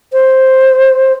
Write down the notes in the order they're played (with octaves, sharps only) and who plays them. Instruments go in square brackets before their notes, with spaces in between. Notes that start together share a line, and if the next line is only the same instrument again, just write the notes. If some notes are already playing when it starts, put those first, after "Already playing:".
[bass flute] C5